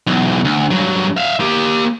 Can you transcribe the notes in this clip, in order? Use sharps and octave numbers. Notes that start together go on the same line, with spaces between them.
B1 E2
D2
G2 F#3
E5 F5
A#3 G4